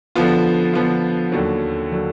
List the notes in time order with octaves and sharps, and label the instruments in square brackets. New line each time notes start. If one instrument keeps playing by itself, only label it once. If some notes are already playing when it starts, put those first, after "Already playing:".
[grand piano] D3 F3 B3 F4
D3 F3 B3 F4
D#2 D3 F#3
D3 F#3